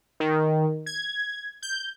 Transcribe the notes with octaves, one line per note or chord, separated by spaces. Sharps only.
D#3
G#6
G6